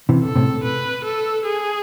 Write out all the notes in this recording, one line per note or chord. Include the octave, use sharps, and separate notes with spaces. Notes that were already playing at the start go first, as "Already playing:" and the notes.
C3 E3
A4
A2 C3
B4
A4
G#4